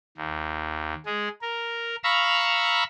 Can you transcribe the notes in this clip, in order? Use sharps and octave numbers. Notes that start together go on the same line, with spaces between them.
D#2
G#3 G#4
A#4
F5 A#5 B5 C#6 E6